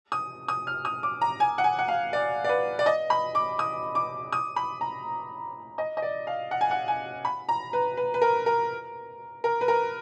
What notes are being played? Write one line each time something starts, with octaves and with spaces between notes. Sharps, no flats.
D#6
D#6
F6
D#6
D6
A#5
G#5
F#5
G#5
F#5
F5
D5
D5
B4
D5
D#5
B5
D6
D#6
D6
D#6
B5
A#5
D#5
D#5
D5
F5
F#5
G#5
F#5
G#5
B5
A#5
B4
B4
B4
A#4
A#4
A#4
B4
A#4